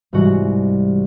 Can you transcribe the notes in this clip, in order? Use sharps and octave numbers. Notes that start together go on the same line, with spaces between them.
C2 G#2 E3 F#4